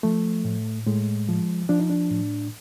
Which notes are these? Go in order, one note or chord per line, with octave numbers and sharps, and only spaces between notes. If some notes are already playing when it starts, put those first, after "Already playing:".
F3 A3
A2
A2 G#3
F3
F3 D4
D#4
D4
A2